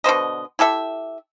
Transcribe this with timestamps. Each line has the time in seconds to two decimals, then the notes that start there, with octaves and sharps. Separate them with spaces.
0.04 B2 D3 C5 D#5
0.59 E4 G4 A4 E5